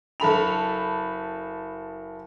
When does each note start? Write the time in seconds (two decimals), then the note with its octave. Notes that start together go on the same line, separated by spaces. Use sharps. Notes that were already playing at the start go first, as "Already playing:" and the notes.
0.20 F#1 A4 B5 F7